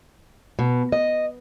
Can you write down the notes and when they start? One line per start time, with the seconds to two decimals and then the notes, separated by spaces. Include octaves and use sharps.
0.59 B2
0.92 D#5